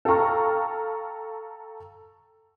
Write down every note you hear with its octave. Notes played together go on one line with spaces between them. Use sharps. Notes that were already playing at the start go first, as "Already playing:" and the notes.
A4 F5 G5 A#5 C#6 F6